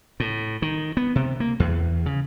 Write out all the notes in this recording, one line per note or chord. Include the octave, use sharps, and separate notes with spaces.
A2
D#3
B3
C3
A#3
E2
C#3